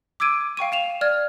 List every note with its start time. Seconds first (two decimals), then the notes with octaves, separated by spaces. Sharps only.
0.20 D6 E6 G#6 D7 D#7
0.57 F5 G5 C#6 D#7
0.72 F5 E7 F7
1.01 D5 F6 G#6